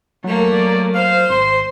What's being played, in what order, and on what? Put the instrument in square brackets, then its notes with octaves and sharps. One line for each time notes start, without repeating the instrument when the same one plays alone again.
[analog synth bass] F#3 [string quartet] A3 A#3
[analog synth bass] F#3 [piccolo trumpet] D5
[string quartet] C5 [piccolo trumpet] F5
[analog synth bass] G#1 [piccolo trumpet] C6